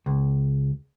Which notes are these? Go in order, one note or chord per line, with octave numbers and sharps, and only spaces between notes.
C#2